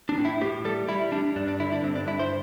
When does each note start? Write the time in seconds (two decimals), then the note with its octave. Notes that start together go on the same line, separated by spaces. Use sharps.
0.09 D4
0.18 A2
0.25 E4
0.41 A2 G4
0.65 G3 A4
0.89 G3 E4
1.12 G3 D4
1.36 G2 D4
1.48 D4
1.60 D3 E4
1.72 D4
1.83 G2 C4
1.95 D4
2.07 G2 E4
2.20 C5